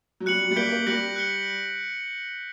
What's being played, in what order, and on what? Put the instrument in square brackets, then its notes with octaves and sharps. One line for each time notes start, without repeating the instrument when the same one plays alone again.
[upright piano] F#3
[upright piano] G3 [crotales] F#6 C#7 F#7
[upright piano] F#3
G3
[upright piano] A#3 [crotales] G6 B6 D7 G7
[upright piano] A#3
[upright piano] G3 [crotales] F#6 A#6 C#7 F#7
[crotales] F#6 C#7 G7